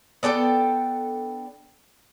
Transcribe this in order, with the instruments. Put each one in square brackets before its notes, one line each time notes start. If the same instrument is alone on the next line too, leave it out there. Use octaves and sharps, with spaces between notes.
[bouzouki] B3 D4 A4 G5